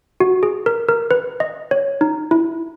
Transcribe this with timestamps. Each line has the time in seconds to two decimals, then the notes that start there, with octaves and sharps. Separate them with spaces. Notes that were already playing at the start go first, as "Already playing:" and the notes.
0.20 F#4
0.43 G#4
0.66 A#4
0.88 A#4
1.11 B4
1.40 D#5
1.71 C#5
2.01 D#4
2.31 E4